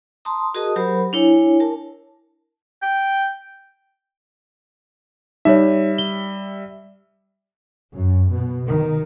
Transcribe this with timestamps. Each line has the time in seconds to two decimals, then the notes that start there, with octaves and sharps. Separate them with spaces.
0.25 A5 A#5 C6 D#6
0.55 F#4 G#4 A#4 D#5 A5 D#6
0.76 F#3 G4 A#4 C5 B5
1.13 D4 E4 C#5 G#5
1.60 A#4 A5
2.82 G5
5.45 G3 D#4 C#5 E5
5.98 G7
7.93 F#2
8.32 B2
8.67 D#3